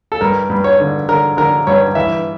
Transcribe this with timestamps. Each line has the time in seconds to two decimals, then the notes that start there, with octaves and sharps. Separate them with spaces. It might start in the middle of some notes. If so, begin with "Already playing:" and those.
0.12 A4
0.21 G2 A#4
0.50 G2
0.64 C#5
0.80 D3
1.09 D3 A#4
1.37 D3 A#4
1.67 G2 C#5
1.95 E3 E5